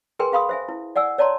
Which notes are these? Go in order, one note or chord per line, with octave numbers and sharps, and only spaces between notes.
G#4 A#4 B4 G5 G#5 C6
G#4 F5 B5 C6 D#6
C5 E5 G#5
E4
D5 F#5 G#5 E6
C#5 D5 A5 A#5 C6